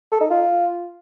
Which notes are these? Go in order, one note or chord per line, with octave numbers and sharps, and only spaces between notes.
A4
D#4
F4